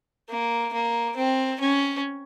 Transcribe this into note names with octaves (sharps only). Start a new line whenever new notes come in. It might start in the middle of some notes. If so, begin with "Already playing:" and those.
A#3
A#3
C4
C#4